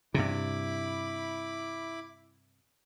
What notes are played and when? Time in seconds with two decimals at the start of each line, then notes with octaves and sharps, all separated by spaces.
0.14 G2 C3 E4 B5 D6